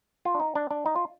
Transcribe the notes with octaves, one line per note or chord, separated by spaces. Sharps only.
F4
D4
D#4
D4
D4
D#4
F4